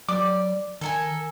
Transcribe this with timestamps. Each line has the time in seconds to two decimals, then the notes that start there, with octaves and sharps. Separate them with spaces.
0.09 F#3 D5 D6
0.81 D#3 A4 A#4 G#5